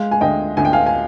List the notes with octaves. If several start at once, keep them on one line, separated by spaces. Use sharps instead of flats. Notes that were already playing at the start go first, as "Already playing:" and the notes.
Already playing: G#3 F5
G#5
D2 D#5 G5
D2 G#5
G5
F5 G#5
G#5